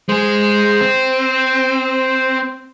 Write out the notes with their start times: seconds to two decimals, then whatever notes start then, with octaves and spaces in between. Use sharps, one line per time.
0.09 G#3 G#4 C5
0.81 C4